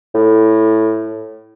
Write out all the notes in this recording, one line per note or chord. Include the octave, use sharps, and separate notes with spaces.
A2